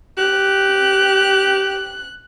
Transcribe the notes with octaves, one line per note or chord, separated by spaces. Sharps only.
G4 F#6